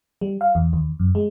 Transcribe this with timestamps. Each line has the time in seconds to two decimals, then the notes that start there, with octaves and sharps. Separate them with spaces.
0.21 G3
0.41 F5
0.55 E2
0.73 D#2
1.00 F#2
1.15 G#3